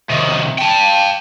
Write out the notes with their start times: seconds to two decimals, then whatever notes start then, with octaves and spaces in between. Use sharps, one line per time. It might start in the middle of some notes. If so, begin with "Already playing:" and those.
0.10 C3 D#3
0.59 G5 A5